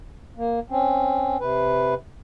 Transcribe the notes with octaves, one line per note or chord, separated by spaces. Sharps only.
A#3
C4 C#4
C3 B4